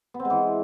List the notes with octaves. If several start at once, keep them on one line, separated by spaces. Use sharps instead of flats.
B3
C4
G#3
E3